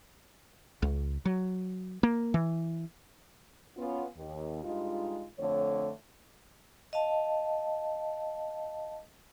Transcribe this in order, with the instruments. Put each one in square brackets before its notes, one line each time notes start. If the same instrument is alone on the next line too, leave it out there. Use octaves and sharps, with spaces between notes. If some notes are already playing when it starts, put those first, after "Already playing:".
[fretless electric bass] C#2
F#3
A#3
E3
[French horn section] B3 C#4 F4
D#2
G2 G#3 D#4 F4
F2 D3 A3 C#5
[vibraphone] D#5 F5 A5